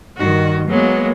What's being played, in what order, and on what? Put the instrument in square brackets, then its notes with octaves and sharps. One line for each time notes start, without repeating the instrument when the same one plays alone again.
[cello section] G2 D#3 [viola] F#4
[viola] F#3 G#3 [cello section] A#3 B3